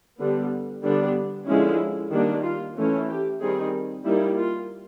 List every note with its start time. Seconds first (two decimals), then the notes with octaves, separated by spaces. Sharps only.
0.19 D3 G3 B3
0.84 D3 G3 B3 D4
1.47 D3 F3 G#3 C#4 E4
2.11 D#3 G3 A#3 D4
2.43 F4
2.77 E3 A3 C#4
3.08 G4
3.40 D#3 G3 C4 D#4 G#4
4.04 G3 A#3 D#4 E4
4.37 F4